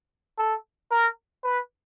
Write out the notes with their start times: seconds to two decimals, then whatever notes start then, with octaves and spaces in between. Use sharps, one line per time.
0.39 A4
0.91 A#4
1.43 B4